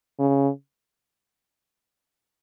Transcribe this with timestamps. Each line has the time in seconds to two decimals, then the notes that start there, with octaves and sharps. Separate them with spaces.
0.19 C#3